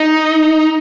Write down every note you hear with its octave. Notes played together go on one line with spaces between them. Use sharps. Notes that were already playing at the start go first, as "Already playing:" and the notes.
Already playing: D#4